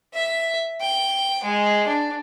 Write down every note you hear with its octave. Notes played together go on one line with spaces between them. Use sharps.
E5
G5
G#3
D4